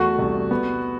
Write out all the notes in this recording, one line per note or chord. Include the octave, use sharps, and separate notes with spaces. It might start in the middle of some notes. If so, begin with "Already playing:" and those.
Already playing: E2 A3 F#4
C2
B3